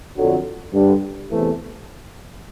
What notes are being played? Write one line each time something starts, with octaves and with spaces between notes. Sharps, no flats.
F2 D3 F#3
G2 D3 G3
E2 C3 E3 A3